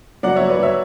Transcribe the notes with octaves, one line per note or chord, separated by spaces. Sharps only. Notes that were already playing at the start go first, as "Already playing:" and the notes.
F#3 D5 F#5
F#3 C#5 E5
B4 D5
F#3 C#5 E5